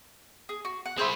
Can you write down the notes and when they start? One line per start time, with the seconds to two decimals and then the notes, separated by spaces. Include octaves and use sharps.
0.49 G#4
0.65 F#4
0.86 F#5
0.98 C4 E4 G#4 C5 E5